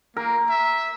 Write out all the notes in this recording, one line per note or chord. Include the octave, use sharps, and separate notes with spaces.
A#3 A#4
E5